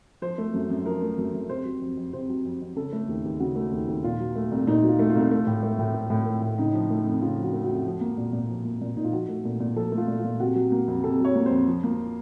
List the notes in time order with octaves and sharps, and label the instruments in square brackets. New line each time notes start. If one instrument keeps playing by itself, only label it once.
[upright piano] F3 C5
A3
F#2
F#2
F3 A#4
A3
F#2
F#2
C3 C5
F#3
F2
F2
C3 C5
F#3
F2
F2
C#3 A4
A3
D#2
D#2
C#3 F#4
A3
D#2
D#2
A#2 F4
F#3
A3
C2
A#2 D#4
F#3
F4
A3
F4
C2
A3
A2
A3
A2
A3
A2
A3
A2
C#3 D#4
F3
A3
F2
C#3 F4
F3
F#4
A3
F2 F#4
F3
A#3
A#2
A#2
F3
A#3
A#2
A#2 D#4
F4
F3 F#4
A3
A#2
A#2
F3 A4
A3
F4
A#2
F4
A#2
C3 F#4
F#3
A#3
F2
C3 A4
F#3 C#5
A#3
C5
F2
F3
A#3